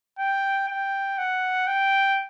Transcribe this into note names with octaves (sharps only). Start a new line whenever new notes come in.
G5
G5
F#5
G5